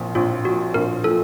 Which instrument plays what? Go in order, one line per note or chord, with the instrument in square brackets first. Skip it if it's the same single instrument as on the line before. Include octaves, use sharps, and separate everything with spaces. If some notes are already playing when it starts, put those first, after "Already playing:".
Already playing: [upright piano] A#1 A#2 F3
[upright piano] A#1 [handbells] F4
[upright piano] A#2 F3 [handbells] F#4
[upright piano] A#1 [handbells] A#4
[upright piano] A#2 F3 [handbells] A4